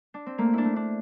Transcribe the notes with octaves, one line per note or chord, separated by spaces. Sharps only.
D4
C4
A3 A#3
D4 E4
A3
D4